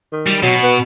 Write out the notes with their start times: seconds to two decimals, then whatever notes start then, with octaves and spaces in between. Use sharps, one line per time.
0.12 D#3
0.27 G3
0.43 B2 F#3
0.63 B3